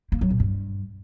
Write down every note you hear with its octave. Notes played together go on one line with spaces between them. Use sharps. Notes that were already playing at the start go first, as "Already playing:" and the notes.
A#3
F#3
A#2
G2